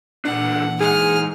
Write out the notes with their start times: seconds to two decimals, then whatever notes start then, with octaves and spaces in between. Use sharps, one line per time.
0.25 C#2 A#2 E3 D4 F#5
0.81 G#2 G#4 F6